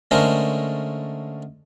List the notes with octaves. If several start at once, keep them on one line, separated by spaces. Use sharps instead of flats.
D3 G#3 A3 C#4 A#4 C5